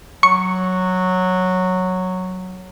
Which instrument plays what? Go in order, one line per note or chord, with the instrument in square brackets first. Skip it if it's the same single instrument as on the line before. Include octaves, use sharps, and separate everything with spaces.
[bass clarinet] F#3 [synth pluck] C#6